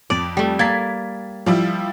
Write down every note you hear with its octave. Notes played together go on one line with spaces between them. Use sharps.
F2 D5
G3 A3
A#3 G#6 A6 B6
F3 G3 E4